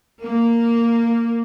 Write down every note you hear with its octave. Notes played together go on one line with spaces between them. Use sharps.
A#3